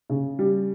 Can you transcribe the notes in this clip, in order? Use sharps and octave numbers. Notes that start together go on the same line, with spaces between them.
C#3
G3